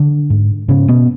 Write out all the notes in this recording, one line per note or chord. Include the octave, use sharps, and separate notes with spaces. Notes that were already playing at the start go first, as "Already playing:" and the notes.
Already playing: D3 D4
G#2
G#2 C#3 C#4
B2 B3